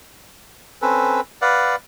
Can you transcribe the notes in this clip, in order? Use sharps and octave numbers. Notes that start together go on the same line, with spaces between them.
C4 C#4 A4 B4
B4 D5 F5 F#5